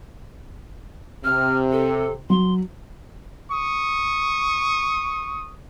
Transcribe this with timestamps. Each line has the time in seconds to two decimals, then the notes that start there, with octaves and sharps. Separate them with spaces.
1.24 C3 F6
1.72 A4
2.30 F#3 C6
3.51 C#6 D#6